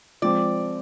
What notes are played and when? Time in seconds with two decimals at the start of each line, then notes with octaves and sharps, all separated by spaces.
0.22 F3 G#3 C4 D5